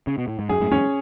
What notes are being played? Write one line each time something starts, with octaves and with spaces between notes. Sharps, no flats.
C#3
B2
A2
G#2
F#2 G#4
F#2 A2
E2 G#2 C#4